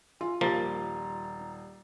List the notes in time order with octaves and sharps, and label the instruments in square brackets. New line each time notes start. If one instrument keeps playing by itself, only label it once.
[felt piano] F4 [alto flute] G#5
[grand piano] D#1 G3 A6 [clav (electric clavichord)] F3 A#3 [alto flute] A#5